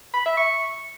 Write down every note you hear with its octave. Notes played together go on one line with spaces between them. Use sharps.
B5
E5
C#6